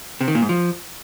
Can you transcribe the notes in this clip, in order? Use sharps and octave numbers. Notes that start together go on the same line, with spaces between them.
C3
D#3
A#2
G#2
F3